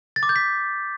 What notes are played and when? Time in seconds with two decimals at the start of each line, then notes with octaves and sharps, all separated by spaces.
0.16 A6
0.23 D6
0.29 G6
0.36 B6